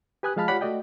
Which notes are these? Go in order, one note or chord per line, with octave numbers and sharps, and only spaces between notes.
G4 B4 G#5 D#6 F#6
F3 G#3 F5 A5 B5 F6
F4 G4 C#5 D5 F#5 B5
A3 F#4 D5 D#5 G5